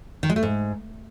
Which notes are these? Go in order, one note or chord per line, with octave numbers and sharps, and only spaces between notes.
D#3
G#3
A3
G#2